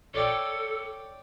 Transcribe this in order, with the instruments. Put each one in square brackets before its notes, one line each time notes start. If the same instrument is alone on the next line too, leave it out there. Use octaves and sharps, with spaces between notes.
[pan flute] A4 [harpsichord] C#5 D5 G5